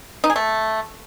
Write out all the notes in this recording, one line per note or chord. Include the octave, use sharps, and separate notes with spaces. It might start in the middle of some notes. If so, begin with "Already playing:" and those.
D#4
G#4
A3